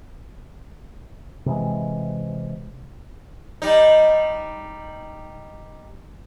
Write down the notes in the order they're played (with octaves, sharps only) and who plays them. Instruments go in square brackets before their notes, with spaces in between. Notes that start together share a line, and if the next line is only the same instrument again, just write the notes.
[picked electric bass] C3 E3 G#3
[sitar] G3 D#4